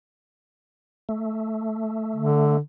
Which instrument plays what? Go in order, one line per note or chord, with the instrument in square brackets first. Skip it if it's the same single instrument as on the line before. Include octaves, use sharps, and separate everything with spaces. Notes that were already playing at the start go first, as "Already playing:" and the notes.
[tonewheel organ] A3
[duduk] D3